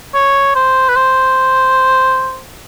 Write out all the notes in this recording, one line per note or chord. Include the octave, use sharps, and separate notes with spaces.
C#5
C5
B4
C5